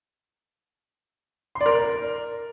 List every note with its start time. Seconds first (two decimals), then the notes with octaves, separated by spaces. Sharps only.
1.55 C6
1.61 D5
1.66 A#4